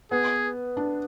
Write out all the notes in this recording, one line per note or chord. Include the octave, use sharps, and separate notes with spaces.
B3 G#4
D4